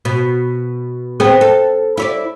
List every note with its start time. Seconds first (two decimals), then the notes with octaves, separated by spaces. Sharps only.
0.05 B2
1.20 B3 C4 G#4
1.41 A4
1.97 E4 C#5 D5